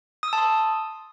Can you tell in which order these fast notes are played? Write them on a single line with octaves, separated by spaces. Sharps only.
D#6 E6 A5 C6